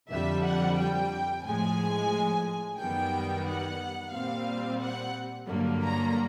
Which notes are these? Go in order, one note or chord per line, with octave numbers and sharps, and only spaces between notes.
F2 D3 G3 E5
F#5
G5
A2 F3 G#3 G#5
F#2 D#3 G3 B3 G5
F#5
A#2 G3 C4 F5
F#5
G2 D3 F#3 A#3
A#5